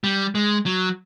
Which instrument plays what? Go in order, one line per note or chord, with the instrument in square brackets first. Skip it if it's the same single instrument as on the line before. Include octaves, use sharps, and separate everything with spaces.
[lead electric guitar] G3
G#3
F#3